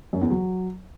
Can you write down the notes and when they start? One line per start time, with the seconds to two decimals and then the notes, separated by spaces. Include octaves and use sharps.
0.13 F#2
0.21 E2
0.30 F#3